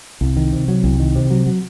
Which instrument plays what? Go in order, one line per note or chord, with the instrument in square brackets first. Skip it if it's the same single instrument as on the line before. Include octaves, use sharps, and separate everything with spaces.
[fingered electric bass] C2
D#3
C3
F#3
C2
D#3
C3
F#3
F#3